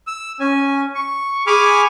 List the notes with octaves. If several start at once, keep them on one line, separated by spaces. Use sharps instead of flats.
E6
C#4 G#5
C#6
G#4 G#5 B5 C#6 D6 F6